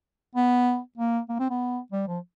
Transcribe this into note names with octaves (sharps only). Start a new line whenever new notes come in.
B3
A#3
A#3
C4
B3
G3
F3